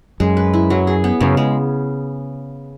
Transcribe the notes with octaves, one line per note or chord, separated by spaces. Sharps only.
F#2 G#3
B4
E4
F#3
G#4
B3
F#2 C#3
G#3